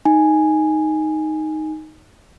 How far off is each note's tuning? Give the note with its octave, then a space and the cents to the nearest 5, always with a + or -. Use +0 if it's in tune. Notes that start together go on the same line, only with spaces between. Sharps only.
D#4 +0 G#5 +0